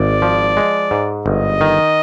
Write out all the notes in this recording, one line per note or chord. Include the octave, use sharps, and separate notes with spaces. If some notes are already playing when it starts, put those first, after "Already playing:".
Already playing: G#1 D5
F3
G#3
G#2
G1 D#5
D#3